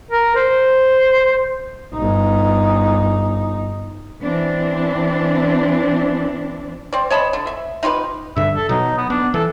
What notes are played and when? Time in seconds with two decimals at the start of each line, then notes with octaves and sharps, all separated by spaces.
0.11 A#4
0.35 C5
1.95 G1 D#4
4.22 E3 C4 D4
6.93 C4 D5
7.10 C#5 D#5 A5 B5
7.33 D3
7.47 E5
7.83 D#4 F4 G4 B4
8.36 G2 D3 E5
8.56 A4
8.69 B2 F#3 D#4
8.98 B3
9.10 B3 D4
9.34 E3 A4